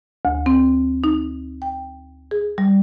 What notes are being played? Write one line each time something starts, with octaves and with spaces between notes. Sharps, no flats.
D2
C4
D#4
G5
G#4
G3